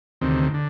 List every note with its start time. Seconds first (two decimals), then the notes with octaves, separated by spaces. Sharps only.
0.21 D2 C3 D#3
0.54 D3